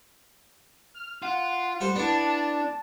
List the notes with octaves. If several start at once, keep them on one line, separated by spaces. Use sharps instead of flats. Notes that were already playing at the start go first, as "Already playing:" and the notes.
F6
F4 F#5
G3 A4 C5
B3 D4 E4 A5